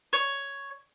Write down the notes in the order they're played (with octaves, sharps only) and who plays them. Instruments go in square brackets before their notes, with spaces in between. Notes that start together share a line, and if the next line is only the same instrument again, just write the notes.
[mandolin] C#5